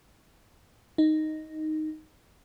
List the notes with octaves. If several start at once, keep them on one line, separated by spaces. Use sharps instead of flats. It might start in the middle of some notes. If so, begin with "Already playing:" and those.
D#4